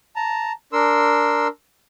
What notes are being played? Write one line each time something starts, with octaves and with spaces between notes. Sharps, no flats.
A5 A#5
D4 A#4 C6 E6